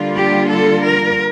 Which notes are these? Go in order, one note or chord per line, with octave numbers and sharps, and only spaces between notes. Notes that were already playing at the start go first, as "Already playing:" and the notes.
Already playing: D3 G3 A#3 D4 F4
G4
A4
A#4